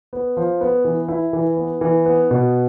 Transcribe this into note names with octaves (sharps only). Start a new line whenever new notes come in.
B3
F3
B3
E3
E4
E3
B3
E3
B3
B2